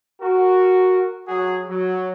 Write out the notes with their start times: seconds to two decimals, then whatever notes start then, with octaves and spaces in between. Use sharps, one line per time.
0.21 F#4 A#4
1.27 F#3 F#4 G#4
1.69 F#3